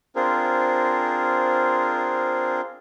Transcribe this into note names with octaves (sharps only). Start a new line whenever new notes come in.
C4 D4 F4 G#4 A#4 C5